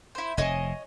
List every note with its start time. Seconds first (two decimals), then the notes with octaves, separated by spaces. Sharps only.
0.15 E4 C5
0.37 F1 A2 C3 C#5 D#5 G#5